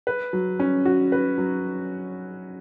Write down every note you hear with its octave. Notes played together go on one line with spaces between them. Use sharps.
B4
F#3
C#4
F#4
B4
F#3